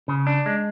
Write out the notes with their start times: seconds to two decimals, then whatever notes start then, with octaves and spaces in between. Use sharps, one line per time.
0.08 C#3
0.27 D4
0.46 G#3